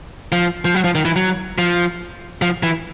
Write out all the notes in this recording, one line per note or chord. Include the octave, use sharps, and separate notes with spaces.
F3
F3
F#3
F3
D#3
E3
F#3
F3
F3
E3